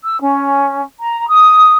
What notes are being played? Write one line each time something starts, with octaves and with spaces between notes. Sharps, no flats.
E6
C#4
A#5
D#6